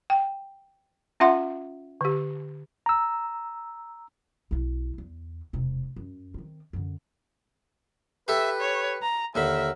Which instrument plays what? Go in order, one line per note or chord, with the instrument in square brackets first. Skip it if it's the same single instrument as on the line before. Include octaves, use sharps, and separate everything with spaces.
[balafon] G5
C#4 F4 E5 F#5 C6
D3 G4
[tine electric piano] A#5 E6
[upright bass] B1 E4
E2
E1 C3
F#2
D#3 C4
F#2 D3
[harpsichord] G4 A4 [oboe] B4 [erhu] E5
[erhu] C#5
A#5
[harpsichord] D#2 D3 B5 [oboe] A#4 [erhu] E5